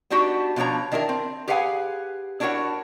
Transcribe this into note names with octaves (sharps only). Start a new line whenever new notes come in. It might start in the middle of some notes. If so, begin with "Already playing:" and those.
B3 D4 D#4 F#4 G4
B2 F3 D4 C#5 A#5
D#3 D4 E4 G#4 A#4
C4
G4 G#4 B4 F5 F#5 G#5
D4 E4 F#4 A#4 C#5 F#5